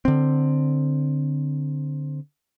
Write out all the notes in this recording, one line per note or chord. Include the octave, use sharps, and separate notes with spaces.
D3 C4